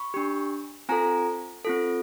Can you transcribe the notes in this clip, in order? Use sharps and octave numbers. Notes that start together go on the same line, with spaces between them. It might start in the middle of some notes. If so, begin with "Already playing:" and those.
Already playing: B5 C#6
D4 G4
C4 F4 A4 G#5 A#5
C4 F4 A4